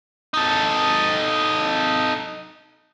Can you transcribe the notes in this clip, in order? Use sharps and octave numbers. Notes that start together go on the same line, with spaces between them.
D#4 A4